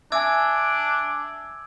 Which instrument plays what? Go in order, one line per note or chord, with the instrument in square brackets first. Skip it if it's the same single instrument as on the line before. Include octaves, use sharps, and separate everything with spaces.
[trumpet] D4 [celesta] E5 G#5 [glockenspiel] D6 E6 G#6